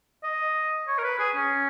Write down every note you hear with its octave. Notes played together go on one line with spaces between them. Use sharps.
D#5
C#5
A#4
B4
G#4
C#4